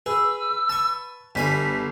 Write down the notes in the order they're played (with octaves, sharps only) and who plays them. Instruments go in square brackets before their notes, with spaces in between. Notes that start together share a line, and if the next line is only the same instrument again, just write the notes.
[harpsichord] G#4 [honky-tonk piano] B4 [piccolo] E6
[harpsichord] A5 C#6
[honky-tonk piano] G1 [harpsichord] G2 G#5 B5 [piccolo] B6